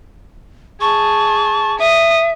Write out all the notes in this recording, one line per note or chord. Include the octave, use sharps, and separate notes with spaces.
G#4 A5 C#6
E5 D#6